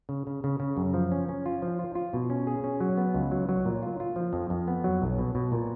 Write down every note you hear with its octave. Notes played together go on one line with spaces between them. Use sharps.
C#3
C#3
C#3
C#3
F#2
F3
C#4
C#4
F4
F3
F4
F4
B2
C#4
G#4
C#4
F#3
B3
C#2
F#3
F#3
A#2
F4
F4
F3
F2
F2
B3
F#3
B1
B2
B2
A#2